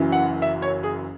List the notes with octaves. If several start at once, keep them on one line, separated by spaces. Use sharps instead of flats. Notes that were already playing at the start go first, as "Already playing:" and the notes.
Already playing: F#1 F#2 E3
F#5
E5
C#5
G#4